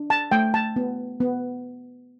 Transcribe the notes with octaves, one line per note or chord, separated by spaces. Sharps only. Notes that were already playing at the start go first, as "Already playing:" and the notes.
Already playing: D4
A5
A3 G5
A5
B3
B3